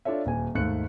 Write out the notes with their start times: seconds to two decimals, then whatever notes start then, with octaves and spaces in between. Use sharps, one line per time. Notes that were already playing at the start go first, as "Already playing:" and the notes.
0.05 D4 F4 A4 C#5 E5
0.26 D#1 G#5
0.55 D#2 G#2 A3 F#6 C#7